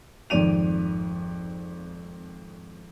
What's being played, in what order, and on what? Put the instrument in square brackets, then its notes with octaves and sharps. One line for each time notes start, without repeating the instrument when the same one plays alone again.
[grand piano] G#1 F2 D#3 D5 D#7 F7